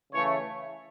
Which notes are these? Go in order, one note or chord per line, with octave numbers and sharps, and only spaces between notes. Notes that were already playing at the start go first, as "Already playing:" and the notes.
C#3 E3 A3 C#5